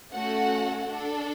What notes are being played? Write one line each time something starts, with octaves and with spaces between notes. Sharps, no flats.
A3 C#4 F#4 A4 F#5
D4 A4